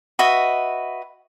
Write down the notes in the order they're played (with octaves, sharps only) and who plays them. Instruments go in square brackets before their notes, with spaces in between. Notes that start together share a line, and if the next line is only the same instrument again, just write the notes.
[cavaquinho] F#4 B4 D#5 E5